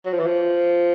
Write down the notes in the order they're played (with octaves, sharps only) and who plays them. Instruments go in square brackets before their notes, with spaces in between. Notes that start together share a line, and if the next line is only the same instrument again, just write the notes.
[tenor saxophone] F#3
F3
E3
F3